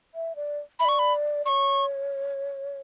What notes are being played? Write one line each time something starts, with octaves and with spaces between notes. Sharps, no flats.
E5
D5
E5 B5
D5 C#6
B5
C#5 D5 C#6